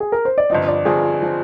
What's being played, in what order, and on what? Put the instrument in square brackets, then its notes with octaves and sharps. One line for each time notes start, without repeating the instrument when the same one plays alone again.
[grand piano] G#4
A#4
C5
D5
[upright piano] G1 G2 F3 C4 [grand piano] D#5
[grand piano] D5
[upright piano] G1 G2 F3 C4 [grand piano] G#4
[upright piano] F3 C4